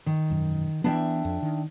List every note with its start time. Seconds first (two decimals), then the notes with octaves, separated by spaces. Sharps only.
0.06 D#3
0.30 E1 F#2
0.84 E3 F#3 B3 D4 E5 G5
1.25 F2
1.42 D#3